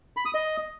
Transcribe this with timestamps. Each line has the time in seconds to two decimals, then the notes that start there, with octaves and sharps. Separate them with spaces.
0.17 B5
0.25 D#6
0.34 D#5